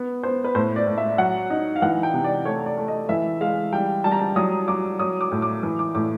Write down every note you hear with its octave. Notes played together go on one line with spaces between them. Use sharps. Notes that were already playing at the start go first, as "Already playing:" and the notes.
Already playing: B3
B3 C5
B4
A2 C5
D5
A2
E5
F#3 F#5
D#4
F5
E3 F#5
G5
C3
D5
A3 C#5
D5
A3
D#5
E3 E5
G#3 F5
G3 G5
G3 A5
A#5
A5
F#3 D#6
F#3 D6
F#3 D#6
D6
A2
D6
E3
D6
A2 D6